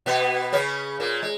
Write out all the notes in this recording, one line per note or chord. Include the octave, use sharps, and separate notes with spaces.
B2 B3
C#3 C#4
A#2 A#3
G#3